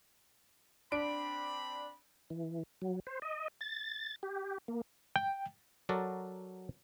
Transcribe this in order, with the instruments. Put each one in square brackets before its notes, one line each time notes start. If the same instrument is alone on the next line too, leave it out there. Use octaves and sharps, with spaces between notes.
[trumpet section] C4 B5 [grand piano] D4 D7
[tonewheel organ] E3
F#3
C5
D#5
A6
G4
A#3
[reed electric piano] G5
[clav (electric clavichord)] F#3 F#4 A4 A#4 D5